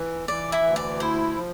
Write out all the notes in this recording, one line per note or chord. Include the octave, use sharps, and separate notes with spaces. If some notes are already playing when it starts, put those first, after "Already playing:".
Already playing: E3
E3 D5
E4 E5
D2
D5
E4 C5
F3